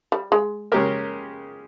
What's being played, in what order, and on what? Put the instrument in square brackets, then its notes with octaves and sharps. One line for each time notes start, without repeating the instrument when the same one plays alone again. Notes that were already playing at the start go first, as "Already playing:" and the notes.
[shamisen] G3
G#3
[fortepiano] C#3 G#3 C#4 G4 A#4 [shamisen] A#3